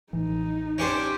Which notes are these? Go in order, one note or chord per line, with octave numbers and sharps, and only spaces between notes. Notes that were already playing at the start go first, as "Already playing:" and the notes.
A1 E3 D#4
C#4 D4 G4 C5